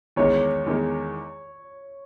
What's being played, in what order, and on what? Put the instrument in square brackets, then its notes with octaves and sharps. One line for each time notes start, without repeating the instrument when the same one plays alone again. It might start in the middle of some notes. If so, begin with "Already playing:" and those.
[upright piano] E2 D#3 G#3 [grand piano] C#5
[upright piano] E2 D#3 G#3